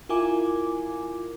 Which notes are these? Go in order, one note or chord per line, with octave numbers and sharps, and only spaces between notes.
E4 F4 A#4 G#5 D6